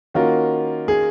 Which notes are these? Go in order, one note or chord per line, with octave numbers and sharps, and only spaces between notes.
D#3 A#3 C#4 F4 F#4 A#4
G#4